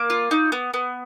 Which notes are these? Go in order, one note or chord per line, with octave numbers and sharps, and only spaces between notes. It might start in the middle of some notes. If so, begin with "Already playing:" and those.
Already playing: A#3 D6
F4
D#4
B3
B3